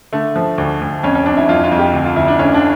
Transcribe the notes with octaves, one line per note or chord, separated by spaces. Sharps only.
D3 A3
F3
D2
D2
F2 C#4
C#4
F2 D4
E4
F2 F4
F4
F2
G4
D2
F4
D2 E4
D4
D3 C#4
D4